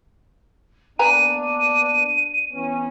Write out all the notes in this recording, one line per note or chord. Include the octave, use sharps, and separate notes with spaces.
A#3 B3 D4 B4 G#5 A#5 D#7
E3 B3 C#4